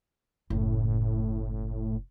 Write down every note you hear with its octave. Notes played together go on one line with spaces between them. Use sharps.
F#1 A2